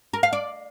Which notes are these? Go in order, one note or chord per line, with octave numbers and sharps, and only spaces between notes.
A#4
F5
D5